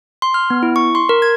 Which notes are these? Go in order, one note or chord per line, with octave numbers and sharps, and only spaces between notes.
C6
F6
B3
E4
C#6
C6
A#4
G#6